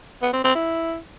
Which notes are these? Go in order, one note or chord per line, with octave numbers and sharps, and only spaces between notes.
B3
C4
C4
E4